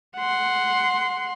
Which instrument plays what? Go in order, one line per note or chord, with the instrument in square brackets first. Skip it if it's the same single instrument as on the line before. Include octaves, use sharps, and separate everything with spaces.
[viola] F#5 C6